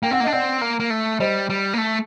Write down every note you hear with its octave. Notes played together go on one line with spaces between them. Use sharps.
A#3 G5
C4 F#5
A#3
D4 D#5
C4 D5 F#5
A#3
A#3
A3
G3 C5 D#5
G3
A#3
A3